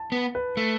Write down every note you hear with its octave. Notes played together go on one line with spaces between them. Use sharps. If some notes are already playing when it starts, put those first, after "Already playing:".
Already playing: A5
B3
B4
A3